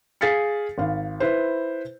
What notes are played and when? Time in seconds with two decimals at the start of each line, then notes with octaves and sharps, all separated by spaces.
0.21 G#4 F5 A6 B6 C#7
0.78 G#1 F5
1.20 E4 B4 C5